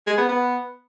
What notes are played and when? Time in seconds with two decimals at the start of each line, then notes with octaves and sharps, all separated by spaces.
0.07 G#3
0.18 B3
0.29 B3